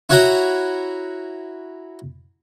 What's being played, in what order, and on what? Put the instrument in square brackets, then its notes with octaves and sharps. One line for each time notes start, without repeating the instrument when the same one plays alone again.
[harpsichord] E4 F#4 C#5 F#5 G5 A#5